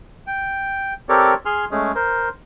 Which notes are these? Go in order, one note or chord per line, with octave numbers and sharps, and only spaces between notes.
G5
C4 G4 A4 A#4 C#5 D5
G#4 G#5 C6 F6
G#3 A3 C#4 G#4
A#4 C5